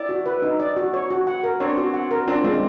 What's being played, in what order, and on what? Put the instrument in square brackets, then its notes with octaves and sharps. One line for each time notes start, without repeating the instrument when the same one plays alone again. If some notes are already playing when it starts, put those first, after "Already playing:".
Already playing: [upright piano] E4 [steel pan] D5
[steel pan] F#4
B4
D#4
D5
F#4
C#5
F#4
F#5
A#4
[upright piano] C4 D4 [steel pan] C#5
[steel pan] F#4
F#5
A#4
[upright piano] C4 D4 [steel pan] F4
[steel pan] G#3 [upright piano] C4 D4